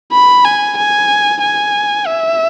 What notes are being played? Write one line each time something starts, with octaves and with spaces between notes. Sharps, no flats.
B5
G#5
G#5
G#5
E5